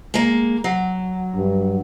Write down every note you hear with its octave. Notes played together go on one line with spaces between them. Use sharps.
G#3 A#3
F#3
G2